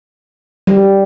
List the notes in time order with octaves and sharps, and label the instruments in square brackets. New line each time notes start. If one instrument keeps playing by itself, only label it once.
[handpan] G3